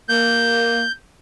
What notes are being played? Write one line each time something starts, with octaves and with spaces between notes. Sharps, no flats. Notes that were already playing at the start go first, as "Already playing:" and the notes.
A#3 G6